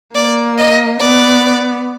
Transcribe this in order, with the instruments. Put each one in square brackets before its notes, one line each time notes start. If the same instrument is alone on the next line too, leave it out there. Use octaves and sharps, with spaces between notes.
[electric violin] A#3 [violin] D5
[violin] D#5
[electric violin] B3 [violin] D5